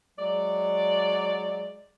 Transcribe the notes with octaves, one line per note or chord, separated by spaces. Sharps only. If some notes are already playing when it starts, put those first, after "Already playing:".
F#3 G#3 D5